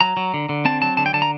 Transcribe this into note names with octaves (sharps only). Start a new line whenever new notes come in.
F#3 A#5
F#3
D3
D3
C4 A5
F#3 A5
D3 A5
G5
D3 A5
A#5